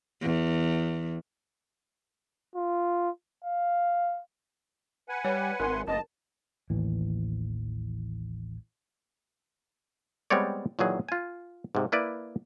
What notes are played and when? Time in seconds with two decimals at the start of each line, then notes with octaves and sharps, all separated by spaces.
0.22 E2
2.56 F4
3.44 F5
5.09 B4 F#5 G#5
5.25 G3 C#5
5.60 G#1 A#4 C6
5.87 F#1 D#5 A5
6.70 A1 D#2 A2 E3
10.30 G3 G#3 B3 C4 C#5 D5
10.79 A#2 D#3 E3 F#3 G#4
11.09 F4 G#5
11.75 G#2 C3
11.92 A#3 E4 B4 D5